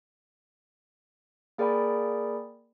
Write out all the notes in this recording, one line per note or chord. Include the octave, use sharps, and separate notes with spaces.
A#3 G#4 A#4 D5 G5 B5